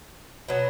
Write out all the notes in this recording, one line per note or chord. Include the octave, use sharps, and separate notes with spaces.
B2 F#3 B3